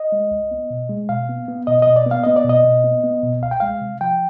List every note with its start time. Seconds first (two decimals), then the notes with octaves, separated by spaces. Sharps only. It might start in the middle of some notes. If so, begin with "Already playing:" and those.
Already playing: D#5
0.12 G#3
0.31 C2
0.51 B3
0.70 B2
0.89 G#3
1.09 B2 F5
1.29 B3
1.48 B3
1.67 B2 D#5
1.82 D#5
1.87 B2
1.96 D5
2.06 B3
2.11 F5
2.24 B3 D#5
2.36 D5
2.45 B2 D#5
2.64 B2
2.84 B3
3.04 B3
3.23 B2
3.42 C2 F5
3.51 G5
3.60 G#3 F5
3.81 C3
4.01 F3 G5